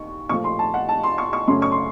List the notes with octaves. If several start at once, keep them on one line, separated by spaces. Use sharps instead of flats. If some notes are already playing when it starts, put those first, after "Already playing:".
Already playing: D#2 C#6
A#2 F3 A3 C#6
C6
A5
F#5
A5
C6
C#6
C#6
F#2 C#3 A3 C#4 C6
C#6
C6